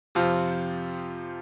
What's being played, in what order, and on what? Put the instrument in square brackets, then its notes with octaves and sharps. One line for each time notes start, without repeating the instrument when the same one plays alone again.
[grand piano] F2 C3 F3 C4 F4